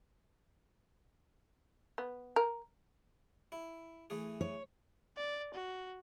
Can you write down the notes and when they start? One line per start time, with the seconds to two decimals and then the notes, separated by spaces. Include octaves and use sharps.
1.98 B3
2.36 A#4
3.52 E4
4.10 E3 A3 G#4
4.41 C#5
5.17 D5
5.53 F#4